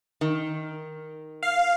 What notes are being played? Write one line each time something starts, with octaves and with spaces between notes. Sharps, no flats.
D#3
F5